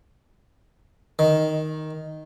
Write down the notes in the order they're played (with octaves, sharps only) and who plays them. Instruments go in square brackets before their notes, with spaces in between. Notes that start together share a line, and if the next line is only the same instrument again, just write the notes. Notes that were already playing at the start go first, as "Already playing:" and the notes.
[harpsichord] D#3